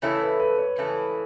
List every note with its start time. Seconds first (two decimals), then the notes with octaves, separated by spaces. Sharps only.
0.02 C#3 E3 A3 E4 A4 C#5
0.21 B4
0.40 B4
0.58 C#5
0.78 C#3 E3 A3 E4 A4